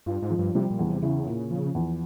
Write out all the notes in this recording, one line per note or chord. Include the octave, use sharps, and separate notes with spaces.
G2 F4
G#2
F3
G2
C3 G3
A#2
E2
C3
C#3 E4
A#2
F3
E2